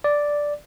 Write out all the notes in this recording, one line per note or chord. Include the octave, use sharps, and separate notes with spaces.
D5